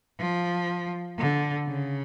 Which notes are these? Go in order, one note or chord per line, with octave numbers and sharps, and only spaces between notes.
F3
D3
C#3